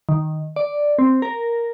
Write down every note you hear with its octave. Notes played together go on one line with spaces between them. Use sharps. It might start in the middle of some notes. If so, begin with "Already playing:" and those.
D#3
D5
C4
A#4